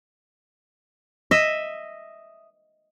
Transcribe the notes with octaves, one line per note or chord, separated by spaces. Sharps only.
D#5 E5